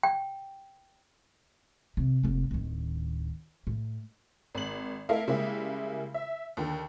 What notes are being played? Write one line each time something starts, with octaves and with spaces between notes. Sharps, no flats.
G5
C3
F1 A#3
D1 D#3
A2
G#1 F#7
A3 E4 A4 A#4 D#5 F5
C#3 G3 G#3 A#3 E4 G4
E5
D#2 D3